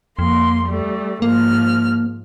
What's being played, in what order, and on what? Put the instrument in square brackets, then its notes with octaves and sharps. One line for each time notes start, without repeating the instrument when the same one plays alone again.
[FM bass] F2 [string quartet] A#3 C6
[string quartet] G3 A3
[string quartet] G#2 F3 F6 [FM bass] A#3